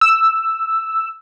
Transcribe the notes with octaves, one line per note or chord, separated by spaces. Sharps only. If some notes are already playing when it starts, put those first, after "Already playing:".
E6